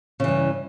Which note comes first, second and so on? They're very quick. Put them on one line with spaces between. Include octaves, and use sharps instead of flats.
C#3 E3 G2